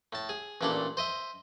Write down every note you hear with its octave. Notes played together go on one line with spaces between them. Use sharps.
A2 A5
G#4
A1 A#2 D4 E4 A4
C5 D#5 E5